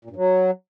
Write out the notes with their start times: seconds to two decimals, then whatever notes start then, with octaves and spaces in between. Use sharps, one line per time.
0.05 A#2
0.10 G2
0.16 F#3